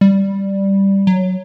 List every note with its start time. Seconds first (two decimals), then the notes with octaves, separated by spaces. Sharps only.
0.01 G3
1.07 F#3